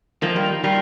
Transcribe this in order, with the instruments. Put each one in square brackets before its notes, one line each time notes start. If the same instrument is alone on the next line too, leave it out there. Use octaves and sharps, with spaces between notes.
[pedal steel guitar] D#3 A#3 F4 A#4 [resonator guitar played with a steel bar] F3
[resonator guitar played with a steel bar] G3
[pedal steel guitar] D#3 A#3 F4 A#4 [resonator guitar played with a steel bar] G3